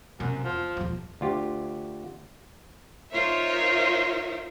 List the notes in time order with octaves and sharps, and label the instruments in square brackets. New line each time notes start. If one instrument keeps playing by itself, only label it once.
[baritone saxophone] F#2 [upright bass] C3
[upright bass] E2 [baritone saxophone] F3
[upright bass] D#1 F3
[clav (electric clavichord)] D2 F4 G4
[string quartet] D#4 F4 A#4 C5 C#5 E5